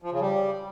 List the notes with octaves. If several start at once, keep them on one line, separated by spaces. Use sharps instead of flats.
F3
C#3
G3